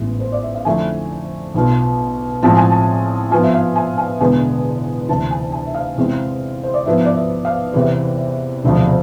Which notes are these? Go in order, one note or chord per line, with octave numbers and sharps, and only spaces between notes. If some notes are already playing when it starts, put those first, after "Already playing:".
Already playing: A1 G#2 G#3 B3 E4
C5
D5
E5
F5
F2 D3 A3 E4 G#5
B1 B2 B3 F4
A2 F3 G#3 C4 F4 A5
G#5
A5
G#2 F3 B3 F4 G#5
E5
F5
G#5
G#5
E1 E2 D3 G#3 B3 G#5
D2 C3 E3 A5
G#5
G#5
E5
F5
E2 C3 G#3 C4 E4
C5
D5
G#2 F3 B3 E4 E5
D5
E5
F5
E2 C3 E3 B4
E1 D2 C3 F3